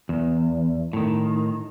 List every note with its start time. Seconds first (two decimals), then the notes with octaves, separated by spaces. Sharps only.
0.09 E2
0.93 A2 D#3